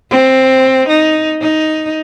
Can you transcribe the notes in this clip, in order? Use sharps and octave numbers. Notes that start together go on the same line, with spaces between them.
C4
D#4
D#4